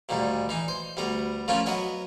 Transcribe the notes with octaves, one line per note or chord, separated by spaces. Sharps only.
D2 A#2 D#3 G3
E3 D#4
C5
D2 G3 B3 A#5
F3 A3 A#3 C#4 E4 F4
F#3 B3 D#5 E5